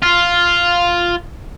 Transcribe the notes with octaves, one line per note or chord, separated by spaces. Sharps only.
F4